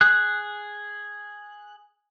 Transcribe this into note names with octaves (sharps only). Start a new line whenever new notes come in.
G#4 F#6